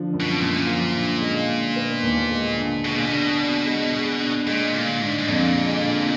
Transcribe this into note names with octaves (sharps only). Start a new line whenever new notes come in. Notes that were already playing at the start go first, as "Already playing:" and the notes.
Already playing: D3 F3
F#2
B2
F#2 A#2
F3
D3
G#3
D3
B3
D#2
G#3
D3
B2 G#4
A#2
B2 D4
D5
G#3
G#4
D4
A#2 G#3
A#2 D3
G#2 D4
G#2
F2 A#2
G#3
D3